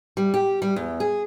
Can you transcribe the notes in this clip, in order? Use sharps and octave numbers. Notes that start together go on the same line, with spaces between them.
G3
G4
G3
E2
G#4